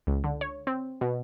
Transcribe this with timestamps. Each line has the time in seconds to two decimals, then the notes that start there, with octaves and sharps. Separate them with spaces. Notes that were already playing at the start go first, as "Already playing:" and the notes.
0.07 C#2
0.24 D3
0.41 C#5
0.67 C4
1.01 B2